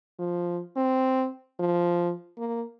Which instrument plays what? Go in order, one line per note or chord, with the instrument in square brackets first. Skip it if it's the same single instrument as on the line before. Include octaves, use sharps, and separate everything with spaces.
[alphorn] F3
C4
F3
A#3